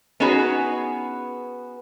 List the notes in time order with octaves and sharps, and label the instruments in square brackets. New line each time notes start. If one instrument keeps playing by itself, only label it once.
[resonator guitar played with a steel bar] B3 C#4 D#4 F#4 G#4 B4